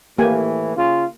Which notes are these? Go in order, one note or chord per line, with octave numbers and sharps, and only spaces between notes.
A2 E3 A#3 G4 G#5
C#3 F4